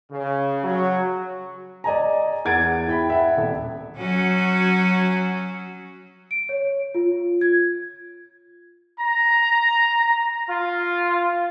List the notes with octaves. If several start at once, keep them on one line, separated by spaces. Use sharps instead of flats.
C#3
F#3
D5 D#5 G#5 A#5
E2 F#5 G#6 A6 D7
E4 G5 B5
E5 F#5
D#1
F#3 C#4 F#4
D7
C#5
F4
G#6
A#5
F4